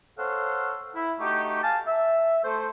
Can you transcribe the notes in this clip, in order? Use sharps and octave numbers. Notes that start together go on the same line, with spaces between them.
A4 C5 C#5 F5 F#5
E4
A3 D#4 F#4 G4
F5 G#5 A5
E5
A3 A4 C5